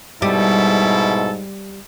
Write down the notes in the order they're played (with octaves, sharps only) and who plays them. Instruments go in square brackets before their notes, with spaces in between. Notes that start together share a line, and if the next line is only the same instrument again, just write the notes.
[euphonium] G#2 [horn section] B2 E4 A4 [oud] G3